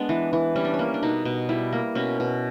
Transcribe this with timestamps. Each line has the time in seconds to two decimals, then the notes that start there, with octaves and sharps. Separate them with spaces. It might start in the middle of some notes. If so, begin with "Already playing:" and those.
Already playing: G#3 B3 D4
0.09 E3
0.33 E3
0.56 G3 C#4
0.65 D4
0.74 C#4
0.79 A#3
0.94 D4
1.03 B2 D#4
1.25 B2
1.49 G3 E4
1.73 A#3
1.95 B2 C#4
2.20 B2